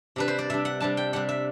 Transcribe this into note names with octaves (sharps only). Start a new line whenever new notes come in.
C3 G3 D4 B4
C5
D5
C3 G3 D4 E5
F#5
C3 G3 D4 A5
G5
C3 G3 D4 F#5
E5